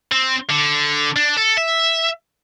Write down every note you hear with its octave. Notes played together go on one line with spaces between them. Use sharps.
C4
D3
D4
A4
E5